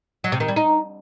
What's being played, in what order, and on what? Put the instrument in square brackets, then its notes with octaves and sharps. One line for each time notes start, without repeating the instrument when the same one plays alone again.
[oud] F#3
C3
D#3
G3
D#4